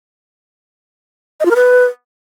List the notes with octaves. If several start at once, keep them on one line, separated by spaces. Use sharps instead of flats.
D#5
F4
A#4
B4